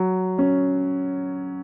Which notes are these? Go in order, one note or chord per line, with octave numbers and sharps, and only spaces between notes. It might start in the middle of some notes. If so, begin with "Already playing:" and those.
Already playing: F#3
C#4